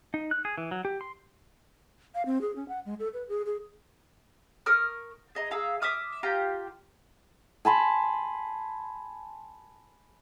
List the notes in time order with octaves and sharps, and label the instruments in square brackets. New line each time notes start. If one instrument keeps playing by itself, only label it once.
[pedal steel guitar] D#4
F#6
G#4
E3
F#3
G4
C6
[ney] F5
C4
G#4
C#4
F#5
G#3
A4
B4
G#4
G#4
[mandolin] A#4 C#6 D#6 F6
G#4 D#5 A#5
G#4 E5 F5 A#5
E5 D6 D#6 F6
F4 G4 A#5
[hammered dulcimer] G#5 A5 B5 C6